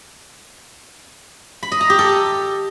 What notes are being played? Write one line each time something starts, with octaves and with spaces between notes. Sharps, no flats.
B5
D#5
A#5
G4
A4